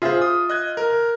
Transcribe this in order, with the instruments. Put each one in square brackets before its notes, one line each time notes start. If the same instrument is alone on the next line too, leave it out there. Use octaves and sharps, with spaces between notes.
[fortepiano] F4 E5 [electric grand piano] G#4 C5
[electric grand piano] D#6
D#5 F#6 G#6
A#4